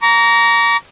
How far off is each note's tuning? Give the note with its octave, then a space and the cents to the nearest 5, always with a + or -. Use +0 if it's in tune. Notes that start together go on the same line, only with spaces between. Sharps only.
A#5 +0 D6 -45